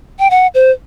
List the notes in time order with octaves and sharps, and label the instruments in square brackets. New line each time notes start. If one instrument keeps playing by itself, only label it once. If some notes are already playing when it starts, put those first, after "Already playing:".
[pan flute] G5
F#5
C5